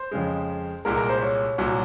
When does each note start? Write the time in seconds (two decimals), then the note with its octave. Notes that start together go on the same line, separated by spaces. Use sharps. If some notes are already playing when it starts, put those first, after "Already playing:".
Already playing: C5
0.11 F2 C#3 G#3
0.85 C2 A#2 G#3 A#4
0.97 A#4
1.09 C5
1.22 C#5
1.58 C2 A#2 F#3